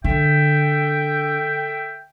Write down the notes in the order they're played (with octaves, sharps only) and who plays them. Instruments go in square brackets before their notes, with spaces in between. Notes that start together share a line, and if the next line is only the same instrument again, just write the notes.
[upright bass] D3 [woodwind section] A4 E5 G5